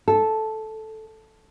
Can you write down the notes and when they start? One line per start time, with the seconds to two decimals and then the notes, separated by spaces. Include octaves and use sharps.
0.08 A4